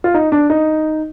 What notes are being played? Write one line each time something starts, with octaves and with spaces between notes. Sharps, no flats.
F4
D#4
D4
D#4